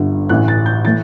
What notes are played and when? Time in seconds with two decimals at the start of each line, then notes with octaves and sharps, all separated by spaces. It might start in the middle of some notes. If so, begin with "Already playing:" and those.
Already playing: G1 G2 D3
0.29 A1 A2 E3 F#6
0.48 A6
0.66 G6
0.85 A2 E3 A6